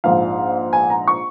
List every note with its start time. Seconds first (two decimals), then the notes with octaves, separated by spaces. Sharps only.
0.04 A#1 G#2 F3 F5
0.73 G#5
0.90 A#5
1.08 C#6